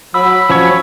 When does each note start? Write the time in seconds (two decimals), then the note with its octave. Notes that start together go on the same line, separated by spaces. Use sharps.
0.14 F#3 B5 E6
0.50 F3 F#3 C#4 C#5